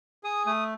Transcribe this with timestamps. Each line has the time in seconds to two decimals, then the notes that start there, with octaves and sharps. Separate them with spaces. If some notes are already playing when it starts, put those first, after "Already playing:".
0.23 G#4 D#6
0.46 A3 D#6